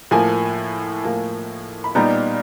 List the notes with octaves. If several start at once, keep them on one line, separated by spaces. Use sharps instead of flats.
A2 F3 A#3 G#5
A2 F3 A#3
B5
A#2 G3 B3 D#4 A#5